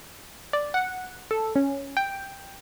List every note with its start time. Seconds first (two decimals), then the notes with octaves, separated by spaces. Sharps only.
0.53 D5
0.74 F#5
1.31 A4
1.56 C#4
1.97 G5